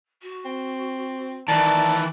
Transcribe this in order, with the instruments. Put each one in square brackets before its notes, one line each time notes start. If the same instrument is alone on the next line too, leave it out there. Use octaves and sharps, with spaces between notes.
[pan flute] F#4
[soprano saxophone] C4
[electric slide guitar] D#3 E3 [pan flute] D5 [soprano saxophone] A5